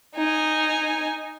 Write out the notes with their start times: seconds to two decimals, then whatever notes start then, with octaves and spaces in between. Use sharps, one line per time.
0.15 D#4 G#5